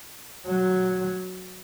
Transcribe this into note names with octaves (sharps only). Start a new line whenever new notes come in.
F#3